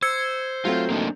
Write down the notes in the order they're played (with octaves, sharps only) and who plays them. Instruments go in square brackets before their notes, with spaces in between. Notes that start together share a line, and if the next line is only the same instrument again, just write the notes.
[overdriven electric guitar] C5 [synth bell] E6 G#6 C#7
[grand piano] F#3 A3 C4 [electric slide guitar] F4
[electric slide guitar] A#3 D4 D#4